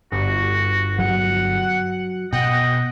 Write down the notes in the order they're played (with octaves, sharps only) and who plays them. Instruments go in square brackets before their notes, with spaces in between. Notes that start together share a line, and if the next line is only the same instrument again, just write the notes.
[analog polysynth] G1 G2 [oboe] F#4
[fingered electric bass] F#3 [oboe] F#5
[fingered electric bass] B2 [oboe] D#5 [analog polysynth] F#5 G5